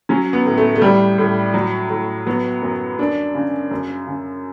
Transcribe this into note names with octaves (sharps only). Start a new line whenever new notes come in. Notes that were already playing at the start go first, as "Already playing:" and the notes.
F#3 C#4
B3
A2
A3
A3
A2 G3
A2
F#3
A2
F#3 B3
F#2
F#2 D4
C#3
F#2
C#3